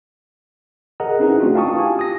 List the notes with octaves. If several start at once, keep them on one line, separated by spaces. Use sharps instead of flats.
G#4 A#4 D#5 F#5 A#5
C4 C#4 D#4 E4 G#4 B4
A3 C4 D4 F4 F#4
F5 G5 A5 C#6 D#6
E4 F4 G4 G#5
D#6 A#6